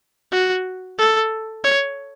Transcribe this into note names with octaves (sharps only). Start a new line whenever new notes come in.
F#4
A4
C#5